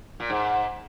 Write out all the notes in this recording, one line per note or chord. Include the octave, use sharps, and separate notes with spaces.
A#2
G#2